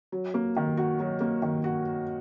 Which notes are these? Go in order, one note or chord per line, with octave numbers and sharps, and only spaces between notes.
F#3
A#3
D#3
F#4
F#3
A#3
D#3
F#4